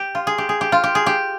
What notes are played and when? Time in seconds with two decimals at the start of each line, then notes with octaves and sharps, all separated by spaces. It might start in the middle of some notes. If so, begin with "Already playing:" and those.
Already playing: G4
0.15 F4
0.27 G#4
0.38 G4
0.49 G#4
0.61 G4
0.72 F4
0.84 G4
0.95 G#4
1.06 G4